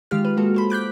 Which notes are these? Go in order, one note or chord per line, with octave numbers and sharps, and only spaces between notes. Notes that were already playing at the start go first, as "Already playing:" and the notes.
D#3 G#3 F4 G4 F6
B4
G#3 A#3 F#4 A4
A4 C5 B5
D6 F#6 G6 B6